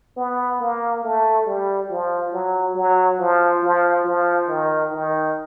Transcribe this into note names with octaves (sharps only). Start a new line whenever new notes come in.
B3
A#3
A3
G3
F3
F#3
F#3
F3
F3
F3
D#3
D#3